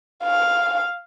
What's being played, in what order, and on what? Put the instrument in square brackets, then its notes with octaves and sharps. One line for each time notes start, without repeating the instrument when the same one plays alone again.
[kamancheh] F5